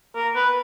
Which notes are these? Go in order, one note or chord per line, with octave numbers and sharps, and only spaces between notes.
A#4
B4